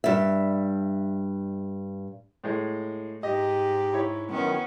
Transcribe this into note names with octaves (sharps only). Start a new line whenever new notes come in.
G2 E5
A2 G#3
G#2 G4 D#5
E4 C#5
F#2 D#3 B3 C#4